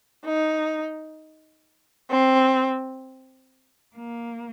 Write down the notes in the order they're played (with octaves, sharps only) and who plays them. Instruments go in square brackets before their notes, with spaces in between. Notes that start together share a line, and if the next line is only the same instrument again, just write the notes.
[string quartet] D#4
C4
A#3